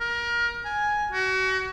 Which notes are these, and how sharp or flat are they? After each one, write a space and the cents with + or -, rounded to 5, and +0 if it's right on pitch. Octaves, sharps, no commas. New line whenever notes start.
A#4 +25
G#5 +5
F#4 +35